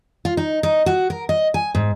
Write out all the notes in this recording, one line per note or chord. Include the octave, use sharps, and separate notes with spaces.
F4
D#4
D#4
F#4
A#4
D#5
G#5
G#2